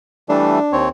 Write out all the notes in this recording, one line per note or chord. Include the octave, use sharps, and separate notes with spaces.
E3 G3 A3 D4
D#2 C4 C#5